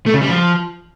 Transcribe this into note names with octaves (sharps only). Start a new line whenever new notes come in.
A3
C#3
G3
F3